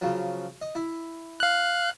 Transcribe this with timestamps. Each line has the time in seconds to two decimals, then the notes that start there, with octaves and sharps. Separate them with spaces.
0.01 C#3 F3 F#3
0.62 D#5
0.75 E4
1.40 F5 F#6